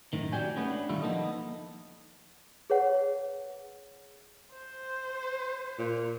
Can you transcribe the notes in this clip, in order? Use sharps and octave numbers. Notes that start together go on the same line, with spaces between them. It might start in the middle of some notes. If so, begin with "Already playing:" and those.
F#2 A2 D#3
F#4 G4 D5 G5 G#5
A3 B3 C#4
D4
D3 D#3 G3 E4 F4
F3 A#3 B3 D#4 A4 D#5
G#4 B4 C#5 F#5
C5
A#2